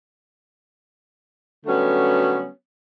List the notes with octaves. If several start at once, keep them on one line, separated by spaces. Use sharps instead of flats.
D3 F#3 G3 A3 B3 C#4